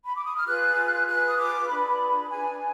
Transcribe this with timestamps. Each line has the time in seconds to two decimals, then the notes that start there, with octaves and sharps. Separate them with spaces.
0.04 B5
0.15 D6
0.25 D#6
0.35 F6
0.45 F4 G#4 B4 F#6
1.06 F4 G#4 B4 F#6
1.27 D#6
1.37 D6
1.68 D4 F4 G#4 B4 B5
2.29 D4 G#4 B4 G#5